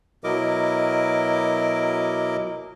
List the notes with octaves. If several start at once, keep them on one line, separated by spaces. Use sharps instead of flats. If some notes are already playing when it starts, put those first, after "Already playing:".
B2 F#3 E4 A#4 D#5 D6